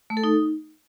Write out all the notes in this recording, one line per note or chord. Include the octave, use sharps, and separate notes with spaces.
A3
A4
D#4